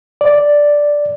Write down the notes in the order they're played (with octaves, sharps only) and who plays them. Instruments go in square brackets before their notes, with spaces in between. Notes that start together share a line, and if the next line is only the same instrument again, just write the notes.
[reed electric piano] D5